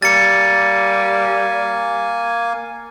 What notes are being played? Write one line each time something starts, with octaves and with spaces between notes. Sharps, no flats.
G3 A#3 G#5 A6 C#7